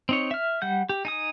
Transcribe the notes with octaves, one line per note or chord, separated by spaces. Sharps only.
C4 D#4 C#5
E5 F6
G3 F#5 G6
G4
D#4 G#5 D#6